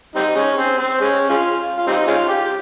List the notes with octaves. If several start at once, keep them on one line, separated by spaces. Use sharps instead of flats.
G3 C4 D#4
G#3 C#4
C4
C4
G#3 C#4
G#3 C#4 F4
F4
G3 C4 D#4
G#3 C#4 F4
G4